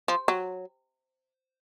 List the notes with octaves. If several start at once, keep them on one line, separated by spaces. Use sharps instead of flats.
F3
F#3